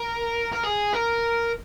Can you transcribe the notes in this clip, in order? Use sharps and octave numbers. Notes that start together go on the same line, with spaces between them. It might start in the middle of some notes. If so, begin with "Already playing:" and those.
Already playing: A#4
A#4
G#4
A#4